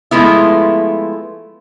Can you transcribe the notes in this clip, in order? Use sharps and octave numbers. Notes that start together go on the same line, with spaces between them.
F3 G#3 A3 B3 E4